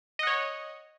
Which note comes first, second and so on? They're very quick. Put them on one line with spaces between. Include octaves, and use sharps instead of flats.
D#5 F#5 C#5